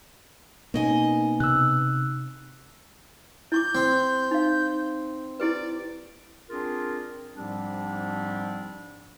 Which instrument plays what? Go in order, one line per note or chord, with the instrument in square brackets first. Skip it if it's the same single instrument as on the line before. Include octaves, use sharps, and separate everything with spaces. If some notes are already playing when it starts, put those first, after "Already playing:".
[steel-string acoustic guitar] B2 D#5 G#5 [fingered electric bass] A#3 [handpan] C4 C#4 D#4
[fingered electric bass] C3 [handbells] E6 F#6
[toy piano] E4 C#6 D6 [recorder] G6
[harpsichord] C4
[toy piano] D#4 F5
[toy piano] E4 G4 B4 [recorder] D5
[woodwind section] C4 D4 F4 G#4 A#4
G#2 F3 G3 C4 D4 G4